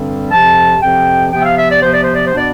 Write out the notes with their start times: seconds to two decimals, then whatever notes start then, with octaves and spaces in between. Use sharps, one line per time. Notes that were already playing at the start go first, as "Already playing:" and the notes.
Already playing: G2 D3 G3 C4
0.31 F2 C3 F3 A5
0.81 F2 C3 F3 G5
1.32 C3 F3 B3 G5
1.40 E5
1.44 F5
1.57 E5
1.70 D5
1.82 C3 F3 B3 C5
1.93 D5
2.04 C5
2.15 D5
2.25 C5
2.33 B2 B3 D4 D5